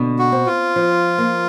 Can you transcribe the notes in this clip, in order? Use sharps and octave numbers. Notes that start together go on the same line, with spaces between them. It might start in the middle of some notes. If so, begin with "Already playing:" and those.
Already playing: B2 D3
F#4
C4
F4
F3
A#3